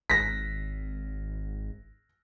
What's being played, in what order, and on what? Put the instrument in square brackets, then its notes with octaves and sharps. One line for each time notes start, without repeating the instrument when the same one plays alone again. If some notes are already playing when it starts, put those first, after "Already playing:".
[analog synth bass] G#1 [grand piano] A#6 B6